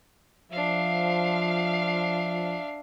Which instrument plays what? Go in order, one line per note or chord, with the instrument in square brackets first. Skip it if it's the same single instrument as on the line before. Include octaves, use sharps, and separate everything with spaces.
[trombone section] F3 [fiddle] D4 E5 [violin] F5